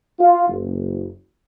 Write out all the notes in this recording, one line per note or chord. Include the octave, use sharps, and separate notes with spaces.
F4
F#1